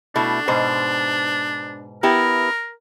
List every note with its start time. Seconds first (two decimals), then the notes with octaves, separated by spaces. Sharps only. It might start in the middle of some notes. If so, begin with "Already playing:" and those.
0.16 B2 A3 D4 E4
0.48 G#2 B2 C5
2.03 B3 E4 G4 A#4